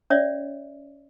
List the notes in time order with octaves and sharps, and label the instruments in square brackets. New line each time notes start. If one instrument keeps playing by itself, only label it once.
[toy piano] C#4 C#5 D5 E5